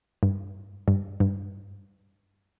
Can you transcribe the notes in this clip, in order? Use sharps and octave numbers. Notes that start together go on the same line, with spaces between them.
G2
G2
G2